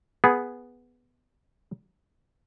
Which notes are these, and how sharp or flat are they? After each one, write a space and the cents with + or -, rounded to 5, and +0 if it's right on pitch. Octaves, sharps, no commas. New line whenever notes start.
B3 +0 G#4 +0